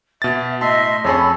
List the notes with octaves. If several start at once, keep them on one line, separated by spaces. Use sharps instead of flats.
B2 E5 A6
A2 D#5 E5 A5 C6
F2 C#4 G#4 A4 C#5 B5